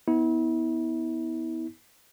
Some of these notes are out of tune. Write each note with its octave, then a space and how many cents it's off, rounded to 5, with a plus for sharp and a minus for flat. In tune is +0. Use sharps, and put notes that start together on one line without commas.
B3 +0 E4 -35